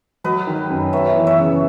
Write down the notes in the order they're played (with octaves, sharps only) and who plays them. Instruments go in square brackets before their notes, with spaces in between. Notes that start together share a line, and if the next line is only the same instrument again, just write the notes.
[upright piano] F#3 [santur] B4 D#5
[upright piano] D#3
F#2
[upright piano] B3 [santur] C#5 E5
[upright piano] E3
[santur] C#5 E5
[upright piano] C#3